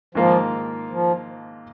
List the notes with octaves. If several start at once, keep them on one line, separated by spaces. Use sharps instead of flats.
G#2 D#3 F3 A#3 F4
F3